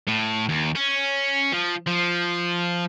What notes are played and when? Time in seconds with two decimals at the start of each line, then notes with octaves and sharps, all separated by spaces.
0.08 A2
0.49 D#2
0.76 C#4
1.53 F3
1.87 F3